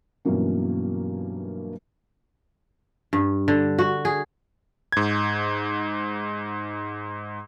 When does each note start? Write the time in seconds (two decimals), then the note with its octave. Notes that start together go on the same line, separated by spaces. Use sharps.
0.25 G2 B2 E3 F#3 A#3 C#4
3.13 G2
3.48 D3
3.79 F#4
4.05 G#4
4.92 G#2 G#6